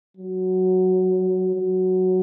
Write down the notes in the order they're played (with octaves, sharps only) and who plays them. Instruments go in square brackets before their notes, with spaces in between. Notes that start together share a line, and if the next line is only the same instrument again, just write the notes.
[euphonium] F#3
F#3